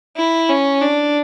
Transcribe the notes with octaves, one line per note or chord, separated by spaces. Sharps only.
E4
C#4
D4